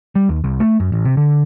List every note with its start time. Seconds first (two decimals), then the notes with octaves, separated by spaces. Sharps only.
0.15 G3
0.29 D#2
0.44 C2
0.60 A3
0.80 F#2
0.92 A1
1.05 C3
1.17 D3